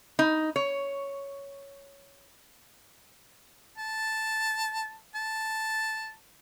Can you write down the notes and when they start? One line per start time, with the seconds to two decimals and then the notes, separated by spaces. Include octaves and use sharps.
0.19 D#4
0.56 C#5
3.78 A5
5.15 A5